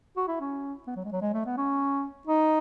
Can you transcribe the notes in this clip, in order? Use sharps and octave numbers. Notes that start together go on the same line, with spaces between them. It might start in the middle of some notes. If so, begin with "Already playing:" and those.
F#4
E4
C#4
B3
F#3
G#3
F#3
G#3
A3
B3
C#4
D#4